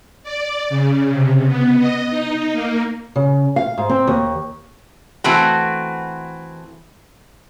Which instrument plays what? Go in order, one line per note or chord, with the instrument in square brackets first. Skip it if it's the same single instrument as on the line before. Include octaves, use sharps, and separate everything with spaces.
[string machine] D5
C#3
C3
B3
D#5
D#4
A#3
[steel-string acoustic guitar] C#3
F5
G#2
C4
D#2
[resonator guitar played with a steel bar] E3 A3 C4 F#4